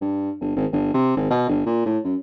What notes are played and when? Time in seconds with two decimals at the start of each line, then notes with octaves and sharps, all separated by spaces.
0.01 G2
0.41 G1
0.56 G#1
0.72 G1
0.94 C3
1.16 G#1
1.30 B2
1.49 G1
1.66 A#2
1.86 A2
2.04 F#2